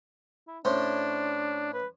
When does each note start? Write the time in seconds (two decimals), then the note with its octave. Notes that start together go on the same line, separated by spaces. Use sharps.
0.48 E4
0.65 A2 C#4 D4 C5
1.74 B4